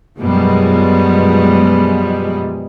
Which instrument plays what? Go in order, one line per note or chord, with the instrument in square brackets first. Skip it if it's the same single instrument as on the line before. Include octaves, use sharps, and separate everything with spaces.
[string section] F#2 B2 F3 G3 G#3